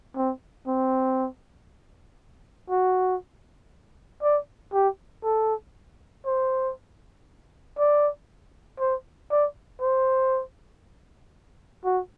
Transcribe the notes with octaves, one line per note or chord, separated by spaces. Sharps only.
C4
C4
F#4
D5
G4
A4
C5
D5
C5
D5
C5
F#4